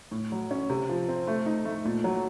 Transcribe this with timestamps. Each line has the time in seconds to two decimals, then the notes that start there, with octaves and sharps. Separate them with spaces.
0.11 A2
0.32 F#3
0.51 C#4
0.70 C3
0.89 F3
1.09 C4
1.27 A3
1.46 D#4
1.65 A3
1.85 A#2
2.04 F#3